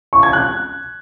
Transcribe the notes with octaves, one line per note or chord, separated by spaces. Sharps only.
C#6
G#6
F#6